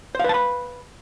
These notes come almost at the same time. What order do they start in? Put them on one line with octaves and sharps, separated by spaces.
C5 F5 B4 A5 B5